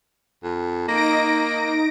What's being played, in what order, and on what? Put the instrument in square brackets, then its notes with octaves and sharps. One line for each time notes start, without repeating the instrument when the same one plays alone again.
[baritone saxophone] F2
[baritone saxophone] A#3 [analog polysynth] D#4 A#6 D7